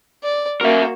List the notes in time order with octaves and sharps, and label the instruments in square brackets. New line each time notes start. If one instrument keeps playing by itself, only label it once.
[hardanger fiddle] D5
[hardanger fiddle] A#3 F#4 [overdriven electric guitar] A#4 E5